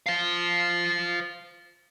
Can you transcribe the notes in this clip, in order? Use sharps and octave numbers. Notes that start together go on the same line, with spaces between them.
C5 F5